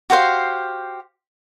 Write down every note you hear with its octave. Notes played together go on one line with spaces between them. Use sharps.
F#4 G4 C5 F5